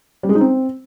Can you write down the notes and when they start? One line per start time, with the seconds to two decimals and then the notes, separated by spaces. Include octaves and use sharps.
0.23 G3
0.29 G#3
0.35 D#4
0.41 C4